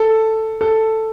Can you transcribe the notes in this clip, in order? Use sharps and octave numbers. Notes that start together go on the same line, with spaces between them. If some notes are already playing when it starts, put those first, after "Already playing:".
Already playing: A4
A4